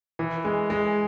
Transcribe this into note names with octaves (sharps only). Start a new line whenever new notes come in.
E3
G#3
G#3